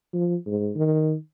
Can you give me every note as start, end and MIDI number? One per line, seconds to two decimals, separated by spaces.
0.13 0.36 53
0.46 0.70 44
0.76 1.14 51